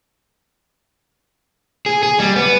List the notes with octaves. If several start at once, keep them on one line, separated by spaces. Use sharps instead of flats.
G#4
G#4
G3
B3